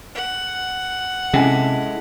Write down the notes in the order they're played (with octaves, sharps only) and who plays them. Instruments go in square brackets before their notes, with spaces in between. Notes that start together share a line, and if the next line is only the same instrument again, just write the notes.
[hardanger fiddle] F#5
[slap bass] C3 [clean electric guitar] G#3 E4 A4 [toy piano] C#4 G#5